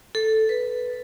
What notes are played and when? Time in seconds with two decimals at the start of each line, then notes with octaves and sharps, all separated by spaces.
0.15 A4
0.49 B4